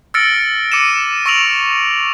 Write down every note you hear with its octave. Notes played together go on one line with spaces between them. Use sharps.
E6 F6 A6 A#6 C#7 D7
D6 C#7 D#7 E7
C#6 E6 A#6 D7 F7 F#7